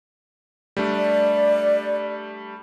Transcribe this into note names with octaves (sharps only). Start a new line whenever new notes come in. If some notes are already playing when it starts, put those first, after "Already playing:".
G3 A3 D4
D5